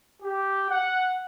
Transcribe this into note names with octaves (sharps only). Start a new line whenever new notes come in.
G4
F#5